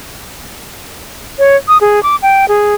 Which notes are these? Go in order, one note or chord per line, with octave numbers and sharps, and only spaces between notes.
C#5
D#6
G#4
D6
G5
G#4